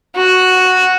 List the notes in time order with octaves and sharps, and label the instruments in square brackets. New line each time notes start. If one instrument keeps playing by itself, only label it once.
[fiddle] F#4